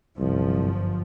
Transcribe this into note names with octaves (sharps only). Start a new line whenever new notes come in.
G1 C2 F#2 F3